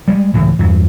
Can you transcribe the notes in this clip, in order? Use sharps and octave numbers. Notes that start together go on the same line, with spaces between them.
G3 G#3
C#2 A2 E3
E2 G2